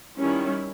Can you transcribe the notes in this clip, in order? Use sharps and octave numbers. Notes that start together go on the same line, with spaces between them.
D#3 G3 C#4 E4